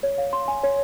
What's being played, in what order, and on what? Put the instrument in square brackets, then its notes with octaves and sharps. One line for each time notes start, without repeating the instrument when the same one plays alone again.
[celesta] C#5
F5
C6
G#5
C#5